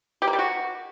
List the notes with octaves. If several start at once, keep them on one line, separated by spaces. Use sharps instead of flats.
G4
A#3
G3
F#4